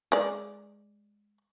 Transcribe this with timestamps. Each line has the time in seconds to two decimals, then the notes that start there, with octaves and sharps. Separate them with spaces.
0.12 G#3 D5